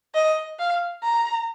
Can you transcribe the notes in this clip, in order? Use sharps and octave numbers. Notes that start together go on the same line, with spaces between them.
D#5
F5
A#5